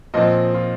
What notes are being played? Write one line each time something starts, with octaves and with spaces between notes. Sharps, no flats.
A#2 F3 C4 D#5
F4